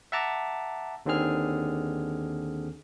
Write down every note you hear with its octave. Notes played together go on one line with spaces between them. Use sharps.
E5 F#5 A5 A#5 D6
D#2 D3 D#3 C4 G#4 F6